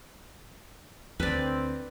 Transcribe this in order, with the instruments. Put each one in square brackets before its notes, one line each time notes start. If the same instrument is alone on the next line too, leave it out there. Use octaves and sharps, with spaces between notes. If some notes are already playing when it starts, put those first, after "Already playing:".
[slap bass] D2 [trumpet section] C4 [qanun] B4 D5